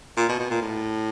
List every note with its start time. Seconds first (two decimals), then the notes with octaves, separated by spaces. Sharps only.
0.17 A#2
0.29 B2
0.39 B2
0.50 A#2
0.61 A2